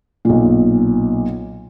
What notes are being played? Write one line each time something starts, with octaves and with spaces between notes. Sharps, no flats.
B1 A#2